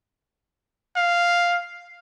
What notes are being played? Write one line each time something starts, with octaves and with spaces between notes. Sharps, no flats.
F5